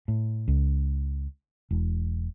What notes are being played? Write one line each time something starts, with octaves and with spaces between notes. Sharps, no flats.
A2
C#2
E1